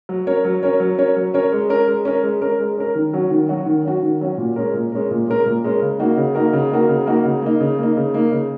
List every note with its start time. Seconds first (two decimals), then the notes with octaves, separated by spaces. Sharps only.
0.09 F#3
0.27 C#4 A#4 C#5
0.45 F#3
0.63 C#4 A#4 C#5
0.80 F#3
0.98 C#4 A#4 C#5
1.16 F#3
1.34 C#4 A#4 C#5
1.52 G#3
1.69 C#4 A#4
1.87 G#3
2.05 C#4 A#4
2.23 G#3
2.42 C#4 A#4
2.60 G#3
2.78 C#4 A#4
2.95 D#3
3.13 F#3 C#4 F#4
3.31 D#3
3.49 F#3 C#4 F#4
3.66 D#3
3.85 F#3 C#4 F#4
4.03 D#3
4.21 F#3 C#4 F#4
4.38 A#2
4.56 G#3 C#4 A#4
4.74 A#2
4.92 G#3 C#4 A#4
5.11 A#2
5.27 G#3 C#4 A#4
5.46 A#2
5.64 G#3 C#4 A#4
5.82 C#3
6.00 A#3 D#4 F#4 A#4
6.17 C#3
6.35 A#3 D#4 F#4 A#4
6.53 C#3
6.71 A#3 D#4 F#4 A#4
6.89 C#3
7.06 A#3 D#4 F#4 A#4
7.25 C#3
7.42 A#3 D#4
7.61 C#3
7.78 A#3 D#4
7.97 C#3
8.14 A#3 D#4
8.32 C#3